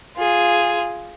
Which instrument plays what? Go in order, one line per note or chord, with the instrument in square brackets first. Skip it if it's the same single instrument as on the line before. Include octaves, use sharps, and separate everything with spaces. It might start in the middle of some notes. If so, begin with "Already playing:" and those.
[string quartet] F4 G#4